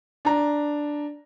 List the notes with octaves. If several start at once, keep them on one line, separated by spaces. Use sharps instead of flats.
D4 A#5